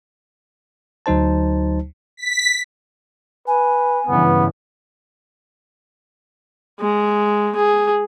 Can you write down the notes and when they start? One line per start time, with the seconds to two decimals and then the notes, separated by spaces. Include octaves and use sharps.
1.06 D2 F#3 D#4 C5 A5
2.17 B6
3.47 B4 G#5
4.07 G2 C#3 E3 B3
6.80 G#3
7.56 G#4